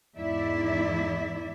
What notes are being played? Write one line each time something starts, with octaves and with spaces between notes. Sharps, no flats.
E2 G#2 D#4 E4 D5 E5